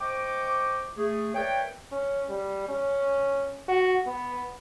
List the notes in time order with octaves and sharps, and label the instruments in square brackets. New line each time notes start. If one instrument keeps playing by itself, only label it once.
[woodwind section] C5 D#5 G5 C#6 D6
A3 G#4
A#4 B4 C#5 D5 E5 G5
[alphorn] C#4
G3
C#4
F#4
B3